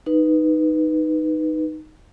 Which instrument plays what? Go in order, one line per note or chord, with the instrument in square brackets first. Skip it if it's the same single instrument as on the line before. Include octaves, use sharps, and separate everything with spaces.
[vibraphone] D#4 B4